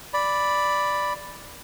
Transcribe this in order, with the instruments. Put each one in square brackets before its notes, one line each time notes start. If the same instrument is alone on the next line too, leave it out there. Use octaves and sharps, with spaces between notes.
[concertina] D5 B5